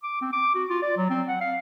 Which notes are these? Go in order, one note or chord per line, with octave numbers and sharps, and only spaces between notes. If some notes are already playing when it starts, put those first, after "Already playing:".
D6
C4
D6
F#4
F4
D5
F#3
C4
F#5
F5